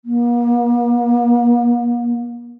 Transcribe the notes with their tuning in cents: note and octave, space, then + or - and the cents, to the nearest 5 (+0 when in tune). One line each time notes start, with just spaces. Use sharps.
A#3 +40